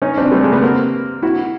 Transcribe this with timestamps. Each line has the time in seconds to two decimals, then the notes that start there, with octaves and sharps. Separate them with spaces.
0.02 C#4 D#4
0.17 C4 D4
0.32 G3 A3
0.42 G#3 A#3
0.52 A3 B3
0.62 A#3 C4
1.23 E4 F#4